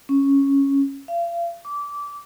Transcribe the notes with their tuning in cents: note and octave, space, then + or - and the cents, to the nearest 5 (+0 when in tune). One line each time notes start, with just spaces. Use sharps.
C#4 -5
F5 -35
D6 -20